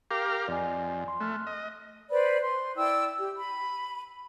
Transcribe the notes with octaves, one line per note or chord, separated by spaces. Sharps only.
G4 A#4 F5 D6
F2 D5 D#5 G#5
C6
A3 F6 F#6
D#5
B4 C5 D5 B5
C6
E4 D5 G5 E6
G4
B5